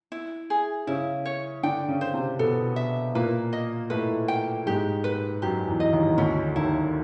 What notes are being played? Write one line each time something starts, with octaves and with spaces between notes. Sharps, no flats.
E4
G#4
C#3 C#4 E4
C#5
D3 D4 G5
C#3 C#4
C5
C3 C4
B2 B3 A4
E5
A#2 A#3 B4
D#5
A2 A3 B4
G5
G#2 G#3 G4
B4
F#2 F#3 G4
E2 E3
D#5
D#2 D#3
D2 D3 C#4
D#2 D#3 E4